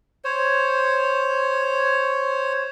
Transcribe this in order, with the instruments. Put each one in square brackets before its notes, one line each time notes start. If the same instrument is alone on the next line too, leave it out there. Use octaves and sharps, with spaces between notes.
[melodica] C5 C#5